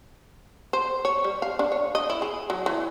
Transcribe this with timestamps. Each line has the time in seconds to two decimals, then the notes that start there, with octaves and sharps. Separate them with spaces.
0.73 C5
1.05 C#5
1.24 G3
1.42 F5
1.59 D4
1.72 C#5
1.95 D#5
2.10 E4
2.22 G#4
2.50 F#3
2.66 E3